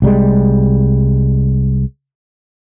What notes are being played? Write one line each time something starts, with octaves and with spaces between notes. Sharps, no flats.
C2 G3 G#3